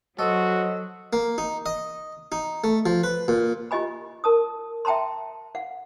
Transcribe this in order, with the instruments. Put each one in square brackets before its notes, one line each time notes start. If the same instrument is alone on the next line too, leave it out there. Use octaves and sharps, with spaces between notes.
[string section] F#3 [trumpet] F#4 [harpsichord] A4 [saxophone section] C5 C#5 D#5
[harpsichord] A#3
D#4
D#5
D#4
A3
F3
B4
A#2
[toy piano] F4 G4 D#5 G#5 B5
A#4 A5 D#6
E5 G5 A5 A#5 C6
F5 F#5